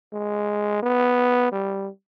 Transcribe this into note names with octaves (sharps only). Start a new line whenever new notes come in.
G#3
B3
G3